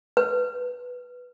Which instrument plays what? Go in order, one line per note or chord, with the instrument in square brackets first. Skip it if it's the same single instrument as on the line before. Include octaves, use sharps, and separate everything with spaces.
[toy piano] B4